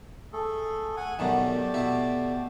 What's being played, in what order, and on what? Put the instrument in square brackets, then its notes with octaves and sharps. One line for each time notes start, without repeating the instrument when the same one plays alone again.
[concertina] A3 G#4 A4
F#5 G#5
[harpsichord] F#2 B2 D#3 [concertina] A3 G4 D5
[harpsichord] B2 E4